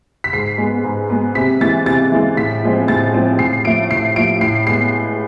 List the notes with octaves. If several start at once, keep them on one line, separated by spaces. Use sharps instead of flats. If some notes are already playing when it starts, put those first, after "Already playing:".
B6
G#2 C7
G#3 B3
G#2
G#3 B3
C3 B6
E3 G#3 A6
C3 A6
E3 G#3
A2 B6
F3 G#3 C4
A2 A6
F3 G#3 C4
A2 C7
F3 A3 D7
A2 C7
F3 A3 D7
A2 C7
G#3 B3 C7